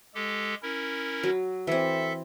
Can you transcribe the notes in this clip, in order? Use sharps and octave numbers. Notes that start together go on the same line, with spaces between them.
G#3 G4 A4
C#4 E4 A#4
F#3
E3 C4 A4 E5